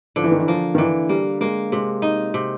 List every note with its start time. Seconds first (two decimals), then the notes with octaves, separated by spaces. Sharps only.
0.16 D3 F3
0.24 E3
0.32 D#3
0.39 E3
0.48 F3 A#3
0.75 D#3
0.78 D3 E3
1.09 G3 A#3
1.41 G#3 A#3
1.72 C3 G#3
2.02 D#4
2.34 C3